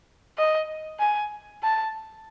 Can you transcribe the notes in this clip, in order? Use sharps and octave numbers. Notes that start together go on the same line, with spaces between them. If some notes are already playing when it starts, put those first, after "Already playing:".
D#5
G#5
A5